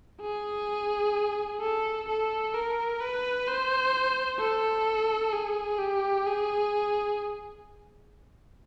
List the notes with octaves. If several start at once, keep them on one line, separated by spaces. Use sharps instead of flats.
G#4
A4
A4
A#4
B4
C5
A4
G#4
G4
G#4